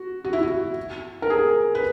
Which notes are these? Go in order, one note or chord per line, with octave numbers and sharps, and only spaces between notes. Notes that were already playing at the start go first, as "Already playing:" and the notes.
Already playing: F#4
F#4
E4
F#4
A#4
G#4
B4